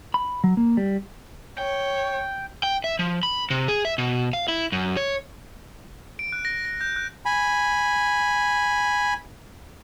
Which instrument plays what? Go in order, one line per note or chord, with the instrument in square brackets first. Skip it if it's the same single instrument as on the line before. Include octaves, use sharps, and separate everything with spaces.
[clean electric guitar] B5
F#3
A#3
G3
[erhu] C#5 [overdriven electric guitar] G5
[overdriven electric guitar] G5
E5
F3
B5
C3
G#4
E5
B2
F5
E4
F#2
C#5
[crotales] D7
F#6
A#6
A#6
G6
F#6
[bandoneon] G#5 B5